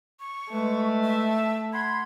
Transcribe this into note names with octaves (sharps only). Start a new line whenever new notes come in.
C#6
G#3 A3 B4
E5
F#5 B5 C6 G#6